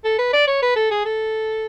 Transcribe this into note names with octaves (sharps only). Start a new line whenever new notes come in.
A4
B4
D5
C#5
B4
A4
G#4
A4